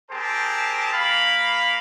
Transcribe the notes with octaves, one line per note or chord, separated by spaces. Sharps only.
C4 G4 G#4 A#4 C5 A5
A#3 F5 B5